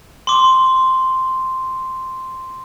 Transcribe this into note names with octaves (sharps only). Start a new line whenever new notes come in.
C6 D6